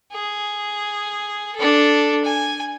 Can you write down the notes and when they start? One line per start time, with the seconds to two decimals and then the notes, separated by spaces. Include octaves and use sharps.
0.13 G#4
1.56 D4 A4
2.25 G#5